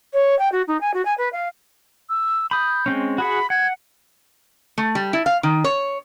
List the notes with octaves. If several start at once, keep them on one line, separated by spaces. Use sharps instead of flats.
C#5
G5
F#4
D#4
G#5
F#4
G#5
B4
F5
E6
B5 D#6 G6
G#3 C4 C#4
F#4 G#4 F#5 B5
F#5 G#6
A3
G3
E4
F5
D#3
C#5